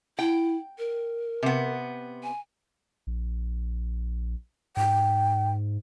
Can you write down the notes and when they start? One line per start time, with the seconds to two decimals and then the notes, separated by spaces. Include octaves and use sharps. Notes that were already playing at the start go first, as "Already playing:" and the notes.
0.19 E4 G5
0.78 A#4
1.43 C3 B3
2.23 G#5
3.07 A#1
4.77 G#2 G5